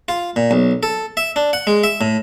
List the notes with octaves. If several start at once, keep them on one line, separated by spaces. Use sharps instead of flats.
F4
A#2
B1
A4
E5
D4
F#5
G#3
E5
A2